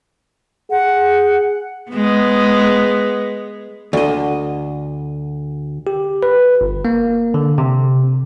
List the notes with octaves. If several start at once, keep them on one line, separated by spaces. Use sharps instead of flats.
G#4 F#5
G#3 B3
D2 D3 D#5
G4
B4
G1
A#3
D3
C3